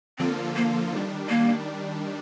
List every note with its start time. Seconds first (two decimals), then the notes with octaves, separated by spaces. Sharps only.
0.18 D3 F3 A#3 C4 F4 A4
0.56 A#3
0.93 D#3 G3 D4
1.29 A#3